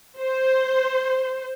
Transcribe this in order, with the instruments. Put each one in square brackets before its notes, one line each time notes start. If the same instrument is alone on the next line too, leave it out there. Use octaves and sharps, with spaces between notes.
[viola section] C5